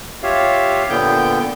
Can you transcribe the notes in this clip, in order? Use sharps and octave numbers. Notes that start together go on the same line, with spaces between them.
F4 G4 C#5 E5 F5
A#2 D3 B3 G5 G6